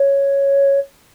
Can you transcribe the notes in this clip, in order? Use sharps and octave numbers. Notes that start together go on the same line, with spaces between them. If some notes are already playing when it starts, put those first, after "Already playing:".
Already playing: C#5